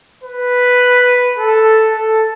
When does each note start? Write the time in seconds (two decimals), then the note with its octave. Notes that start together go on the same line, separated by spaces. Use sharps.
0.24 B4
1.38 A4
1.96 A4